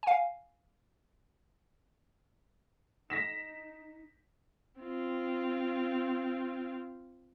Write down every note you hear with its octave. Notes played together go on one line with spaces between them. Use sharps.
F5 G#5
D#4 A#6 B6 E7
C4 F4